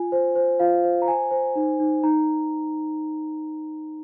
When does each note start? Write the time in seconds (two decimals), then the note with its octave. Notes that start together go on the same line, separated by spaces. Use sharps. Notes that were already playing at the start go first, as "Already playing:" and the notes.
Already playing: F4 G#5
0.12 C5
0.35 C5
0.60 F4 F5
0.84 C5
1.02 A#5
1.07 C5 G#5
1.31 C5
1.56 D#4
1.80 D#4
2.03 D#4 A#5